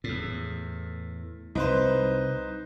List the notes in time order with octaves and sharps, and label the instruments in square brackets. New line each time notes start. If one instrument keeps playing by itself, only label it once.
[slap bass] E2 A2
[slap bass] C2 [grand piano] D#4 B4 C5